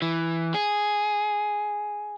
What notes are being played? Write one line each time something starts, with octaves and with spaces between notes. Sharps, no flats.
E3
G#4